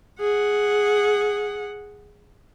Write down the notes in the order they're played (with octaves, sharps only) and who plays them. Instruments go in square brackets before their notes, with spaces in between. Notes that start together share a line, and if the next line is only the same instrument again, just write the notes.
[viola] G#4 F#5